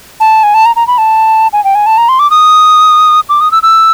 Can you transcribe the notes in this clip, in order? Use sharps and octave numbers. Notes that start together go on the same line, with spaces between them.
A5
G#5
A5
A#5
A#5
B5
A5
G#5
G5
G#5
A5
A#5
C6
D6
D#6
D6
D#6
E6
E6